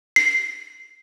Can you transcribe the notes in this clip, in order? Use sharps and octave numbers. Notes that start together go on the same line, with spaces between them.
C7